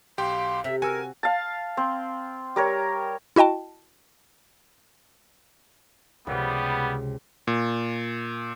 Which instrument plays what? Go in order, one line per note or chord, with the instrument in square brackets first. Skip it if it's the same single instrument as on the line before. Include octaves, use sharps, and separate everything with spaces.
[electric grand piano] B1 G4 G5 [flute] F5 [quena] C6
[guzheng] C3 [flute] A4 [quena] E5
[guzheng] F#4 [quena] A#4 [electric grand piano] G#5 E6
[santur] F5 A5
C4
G3 A#4 C#5
[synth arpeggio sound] E4 F#4 D#5 G5 A5
[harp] C#2 C3 [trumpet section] G3 B3
[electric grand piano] A#2